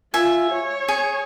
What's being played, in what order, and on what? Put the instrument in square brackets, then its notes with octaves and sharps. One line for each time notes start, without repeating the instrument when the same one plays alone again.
[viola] F4 [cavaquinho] E5 G#5
[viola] C#5
[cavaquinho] G#4